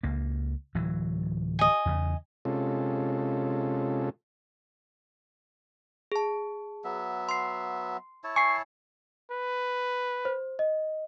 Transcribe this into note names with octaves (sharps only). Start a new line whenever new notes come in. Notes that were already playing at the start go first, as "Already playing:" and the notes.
C#2 A#3
D1 E3 F#3
D#5 G#5
E2 C#3
C3 G#3 C#4 F4 A4
G#4 A5
F#3 B3 E5
C6 C7
E4 C#5 A5
G#5 C#6 C7
B4
C5
D#5